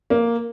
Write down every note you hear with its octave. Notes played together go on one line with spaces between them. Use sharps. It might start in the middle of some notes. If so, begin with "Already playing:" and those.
A#3